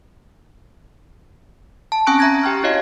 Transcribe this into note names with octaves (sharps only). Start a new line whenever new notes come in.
A5
C4 C#4 G#5 C#6 F#6 D7
E5 A#5 F#6 G#6 A#6
G4 G5 C#6 F6
E4 F#4 C#5 D#5 F5